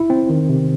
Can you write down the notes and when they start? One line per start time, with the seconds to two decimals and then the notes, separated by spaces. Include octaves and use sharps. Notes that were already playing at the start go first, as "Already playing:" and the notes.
Already playing: E4
0.10 C4
0.30 D#3
0.49 C3